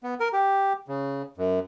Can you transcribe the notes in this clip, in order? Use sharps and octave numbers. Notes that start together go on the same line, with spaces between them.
B3
A#4
G4
C#3
F#2